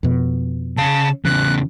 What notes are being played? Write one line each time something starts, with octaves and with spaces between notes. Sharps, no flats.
F2 B2
C#3 F5 A5
E2 C#3 E3 F#6